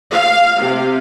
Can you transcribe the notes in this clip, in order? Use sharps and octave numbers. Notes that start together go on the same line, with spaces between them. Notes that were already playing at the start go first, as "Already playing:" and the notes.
F5
C3